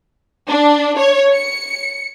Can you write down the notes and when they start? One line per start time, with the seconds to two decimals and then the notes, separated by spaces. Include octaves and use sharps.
0.48 D4
0.97 C#5
1.34 C#7